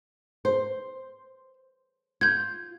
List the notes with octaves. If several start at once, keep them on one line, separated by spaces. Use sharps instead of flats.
C5
F4 G6 G#6